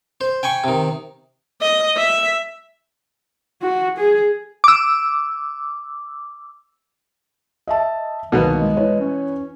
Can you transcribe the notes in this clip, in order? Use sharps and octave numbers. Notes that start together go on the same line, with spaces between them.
C5
G5 G#5 B5 C#6
C3 D#3
D#5
E5
F#4
G#4
D6 E6
D#5 E5 A5
C2 B2 D#3 E3 F#3 A#3 B3
G#3
E3 B4 C#5
C#4